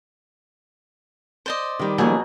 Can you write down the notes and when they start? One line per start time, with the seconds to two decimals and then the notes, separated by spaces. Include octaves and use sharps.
1.46 C5 D5 D#5
1.79 D#3 G3
1.98 B2 F3 F#3 A#3 C#4 G#4